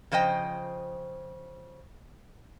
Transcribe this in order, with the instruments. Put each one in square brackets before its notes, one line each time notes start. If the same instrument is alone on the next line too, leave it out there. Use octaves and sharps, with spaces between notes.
[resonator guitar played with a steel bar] C#3 F3 C5 D#5 G5